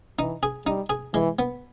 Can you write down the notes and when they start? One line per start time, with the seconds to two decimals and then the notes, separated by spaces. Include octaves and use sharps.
0.18 E3 D#4
0.43 G#4
0.66 G3 D#4
0.90 G#4
1.14 E3 G#3
1.39 B3